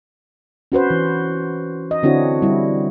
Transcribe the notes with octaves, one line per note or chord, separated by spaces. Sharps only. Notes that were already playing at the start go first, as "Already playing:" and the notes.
C#4 F#4 B4 C5
E3
D#5
D3 C4 D4 E4 F#4 C#5
G3 E4